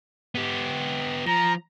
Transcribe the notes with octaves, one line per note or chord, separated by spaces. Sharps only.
B3 G4
F3 A#5